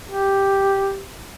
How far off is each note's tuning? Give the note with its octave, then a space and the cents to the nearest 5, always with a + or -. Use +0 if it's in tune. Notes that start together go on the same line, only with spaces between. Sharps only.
G4 +0